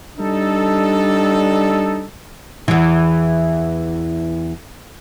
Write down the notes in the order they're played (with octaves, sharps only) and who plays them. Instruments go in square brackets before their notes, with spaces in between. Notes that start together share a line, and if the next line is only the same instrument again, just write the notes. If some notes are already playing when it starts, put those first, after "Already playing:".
[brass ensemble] G3 D4 D#4 A4
[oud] E2 E3